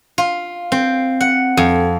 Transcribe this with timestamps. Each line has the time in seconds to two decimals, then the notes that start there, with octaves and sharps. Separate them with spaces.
0.18 F4
0.72 C4
1.21 F#5
1.57 F2